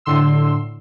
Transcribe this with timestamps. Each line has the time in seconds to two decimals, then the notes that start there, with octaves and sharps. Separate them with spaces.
0.06 A2 D3 C6 E6